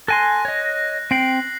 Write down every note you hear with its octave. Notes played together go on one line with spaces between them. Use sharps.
A4 G#5 C6 F#6 A#6
C#5 D#5
C4 G5 C7 F#7